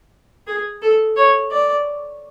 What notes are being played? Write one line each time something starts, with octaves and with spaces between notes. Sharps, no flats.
G#4
A4
C#5
D5